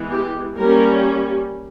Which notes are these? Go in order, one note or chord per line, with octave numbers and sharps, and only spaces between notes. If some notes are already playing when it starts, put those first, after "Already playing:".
Already playing: E3 G#3 B3
G4
G3 A#3 C#4 A#4